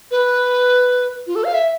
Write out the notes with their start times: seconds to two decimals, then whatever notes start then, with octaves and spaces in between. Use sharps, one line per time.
0.11 B4
1.27 F4
1.36 A4
1.44 F5
1.54 E5